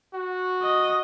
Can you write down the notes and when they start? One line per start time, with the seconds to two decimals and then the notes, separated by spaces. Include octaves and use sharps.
0.13 F#4
0.63 D#5